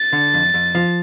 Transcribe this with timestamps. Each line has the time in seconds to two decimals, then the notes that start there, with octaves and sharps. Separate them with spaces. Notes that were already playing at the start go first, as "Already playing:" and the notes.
Already playing: A6
0.12 D3
0.34 F2
0.54 F2
0.75 F3